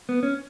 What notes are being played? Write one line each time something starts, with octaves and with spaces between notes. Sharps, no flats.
B3
C#4